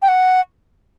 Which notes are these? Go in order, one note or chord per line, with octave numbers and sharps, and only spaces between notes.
G5
F#5